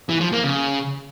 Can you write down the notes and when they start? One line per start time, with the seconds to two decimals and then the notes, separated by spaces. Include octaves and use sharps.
0.09 E3
0.21 F3
0.32 A#3
0.44 C#3